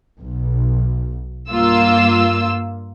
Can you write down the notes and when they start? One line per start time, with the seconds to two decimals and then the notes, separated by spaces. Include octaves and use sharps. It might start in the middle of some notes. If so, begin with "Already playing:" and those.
0.19 B1
1.51 G2 A#3 F4 E6